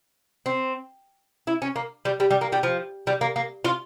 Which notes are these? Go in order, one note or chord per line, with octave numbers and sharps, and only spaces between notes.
C4
E4
C#4
A#3
G3
G3
G3
A#3
G3
F3
G3
A#3
A#3
F4